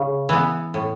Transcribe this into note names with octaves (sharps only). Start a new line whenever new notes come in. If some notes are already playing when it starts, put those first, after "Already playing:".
Already playing: C#3
E3 B3
A2